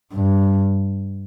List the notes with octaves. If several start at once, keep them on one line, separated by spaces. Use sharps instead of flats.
G2